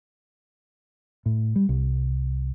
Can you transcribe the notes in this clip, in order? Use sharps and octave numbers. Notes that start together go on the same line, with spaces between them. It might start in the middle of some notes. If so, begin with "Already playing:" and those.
A2
G3
C2